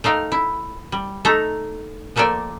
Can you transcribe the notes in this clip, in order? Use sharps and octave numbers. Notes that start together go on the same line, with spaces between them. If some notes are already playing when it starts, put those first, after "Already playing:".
A3 D#4 F5 G5
E4
G3
A3 D#4 A4 A#5
F3 A3 A#3 A4 D5 G5